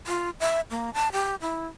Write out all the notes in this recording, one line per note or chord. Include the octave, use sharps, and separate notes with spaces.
F4
E5
A#3
A5
G4
E4